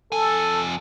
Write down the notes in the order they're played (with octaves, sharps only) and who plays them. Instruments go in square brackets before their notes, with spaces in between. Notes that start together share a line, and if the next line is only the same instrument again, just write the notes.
[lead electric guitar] F2 G#5 [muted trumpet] A4